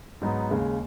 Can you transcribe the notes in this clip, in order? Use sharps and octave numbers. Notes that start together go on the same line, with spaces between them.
G#2 F#3 B3 D#4
D#2 C#3 G#3